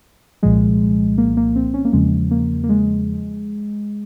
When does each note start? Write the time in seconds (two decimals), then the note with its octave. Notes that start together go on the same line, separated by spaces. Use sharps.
0.43 C2 A#2 F3 G#3
1.18 A#3
1.37 A#3
1.56 C4
1.74 C#4
1.85 A#3
1.93 E2 C#3 F3 G#3
2.31 A#3
2.64 A#3
2.69 G#3